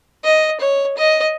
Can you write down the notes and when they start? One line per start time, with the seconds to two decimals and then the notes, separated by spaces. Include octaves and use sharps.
0.24 D#5
0.60 C#5
0.97 D#5